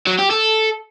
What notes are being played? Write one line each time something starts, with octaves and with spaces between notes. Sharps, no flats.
F#3
G4
A4